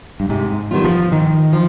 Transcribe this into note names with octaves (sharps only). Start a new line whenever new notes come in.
G2
G#2 C3
D#3 G3 B3 F4
F3
G#2 D#3
F3